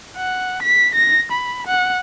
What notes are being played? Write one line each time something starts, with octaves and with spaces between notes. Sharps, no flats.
F#5
B6
A#6
B5
F#5